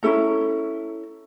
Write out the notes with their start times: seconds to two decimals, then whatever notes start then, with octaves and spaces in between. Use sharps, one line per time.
0.03 C#4 E4 A4 A#5